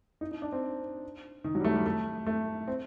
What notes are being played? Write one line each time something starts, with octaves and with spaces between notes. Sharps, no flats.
D#4
D#4
D4
C4
D#3
F#3
G3
A3
G3
A3
A3
C4